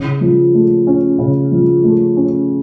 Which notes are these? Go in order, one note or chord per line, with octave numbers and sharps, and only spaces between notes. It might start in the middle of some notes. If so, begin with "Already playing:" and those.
Already playing: C#3
F3
A3
C#4
C#3
F3
A3
C#4